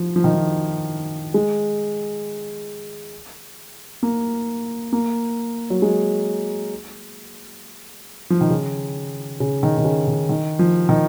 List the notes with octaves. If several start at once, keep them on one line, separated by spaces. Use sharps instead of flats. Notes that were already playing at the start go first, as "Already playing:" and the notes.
Already playing: F3
F3
D#3
F3
G#3
A#3
A#3
F#3
G#3
F3
D#3
C#3
C#3
D#3
D#3
C#3
D#3
D#3
F3
D#3